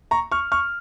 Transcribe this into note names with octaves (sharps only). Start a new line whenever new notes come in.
A#5 C#6
C#6 F6
C#6 F6